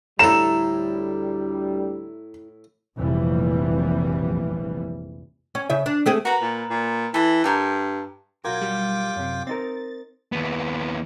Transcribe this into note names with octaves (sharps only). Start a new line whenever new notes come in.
D2 A2 G3 E4 A4 A#5 E7
F1 A#1 E3 G3
C#4
C#3 E5
D4
A3 C4 G#4
F#4 A#4 B4 A#5
A#2
A#2
E3 A4 F#5
G2 A4 A#4 G5
B1 F4 F#4 A#4 G5 D6 G#6
G3
F#2 C3
C4 D#4 A#4 A6
D#2 B3